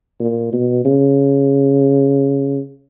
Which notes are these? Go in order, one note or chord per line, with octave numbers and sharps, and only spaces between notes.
A#2
B2
C#3